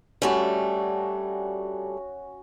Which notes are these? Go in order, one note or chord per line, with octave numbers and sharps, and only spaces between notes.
G3 A3 C#4 D4 F#4